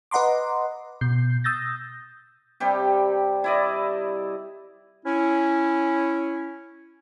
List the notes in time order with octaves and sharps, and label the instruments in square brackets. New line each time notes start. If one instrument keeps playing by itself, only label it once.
[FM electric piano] B4 D#5 F#5 A#5 C6 D6
B2 G6 C7
D#6 E6 G6 A6 A#6
[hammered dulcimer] C3 G3 G4
E4 D5 D#5
[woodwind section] C#4 E4